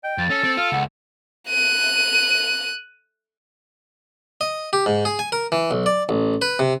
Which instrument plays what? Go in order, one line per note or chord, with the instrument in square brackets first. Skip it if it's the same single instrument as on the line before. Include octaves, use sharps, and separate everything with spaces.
[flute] D#5 [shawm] G5
[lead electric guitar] F2 [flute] A6
[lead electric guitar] C#4 [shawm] A4
[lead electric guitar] C4
[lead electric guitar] F4 [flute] F6
[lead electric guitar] C#2 [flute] F#5
[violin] F#6 D#7
[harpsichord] D#5
G4
G#2
G#4
G#5
A#4
E3
B1
D5
A1
B4
C3